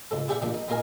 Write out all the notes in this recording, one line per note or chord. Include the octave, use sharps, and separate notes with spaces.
C#2 G#2 A4
E4 G4 G#4 D5 E5 F#5
A#2 F3 D4
D#4
B3 D#4 F4 A#4 D#5 G#5